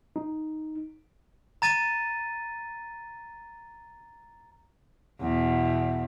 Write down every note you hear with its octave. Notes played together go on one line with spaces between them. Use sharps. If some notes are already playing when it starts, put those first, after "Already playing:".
D#4
A#5 A6 D#7
E2 B2